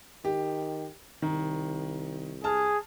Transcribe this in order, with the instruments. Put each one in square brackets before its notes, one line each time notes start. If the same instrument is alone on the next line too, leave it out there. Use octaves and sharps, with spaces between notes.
[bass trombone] D#3 [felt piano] G4
[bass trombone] C2 [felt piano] D#3
[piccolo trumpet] G#4 [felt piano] A5 F6